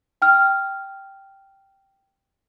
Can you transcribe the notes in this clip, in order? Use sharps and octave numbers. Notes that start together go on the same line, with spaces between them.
G5 F6